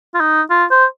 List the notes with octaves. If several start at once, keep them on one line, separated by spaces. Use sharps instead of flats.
F4
D#4
F4
C5